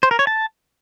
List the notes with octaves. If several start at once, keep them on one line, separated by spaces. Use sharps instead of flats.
C5
A#4
C#5
A5